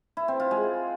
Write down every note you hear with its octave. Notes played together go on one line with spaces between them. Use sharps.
E4
C4
F4
G#3